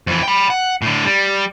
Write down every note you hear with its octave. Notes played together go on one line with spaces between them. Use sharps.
F2 E3
G5 B5
F#5
A2 D3
G3